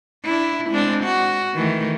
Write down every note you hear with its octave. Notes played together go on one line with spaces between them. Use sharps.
D4 E4
G#3 C4 D4
F#4
D#3 E3 A3